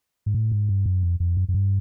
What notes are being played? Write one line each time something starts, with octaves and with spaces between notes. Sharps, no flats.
G#2
A2
G#2
G2
F#2
F2
F2
F#2
F#2
G2